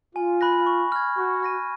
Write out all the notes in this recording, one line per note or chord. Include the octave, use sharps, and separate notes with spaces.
F4 G#5
B5 F#6 A#6
C#6
F6 G#6
F#4 C#6
F6 A#6 D#7